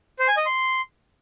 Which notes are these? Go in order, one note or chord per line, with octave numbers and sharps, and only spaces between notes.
C5
G#5
D#5
C6